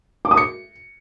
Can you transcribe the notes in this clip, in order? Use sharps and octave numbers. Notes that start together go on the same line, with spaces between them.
D6
D#6
C#7